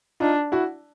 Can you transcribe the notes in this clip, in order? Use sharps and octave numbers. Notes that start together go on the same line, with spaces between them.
D4 D#4 F4
E4 F#4